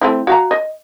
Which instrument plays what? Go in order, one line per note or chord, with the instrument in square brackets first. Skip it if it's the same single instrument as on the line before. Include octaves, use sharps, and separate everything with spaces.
[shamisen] A3 C4 E4
F#4 F5 A#5
D#5